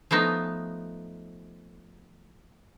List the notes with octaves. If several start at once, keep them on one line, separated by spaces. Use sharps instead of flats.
F3 A3 B3 D#4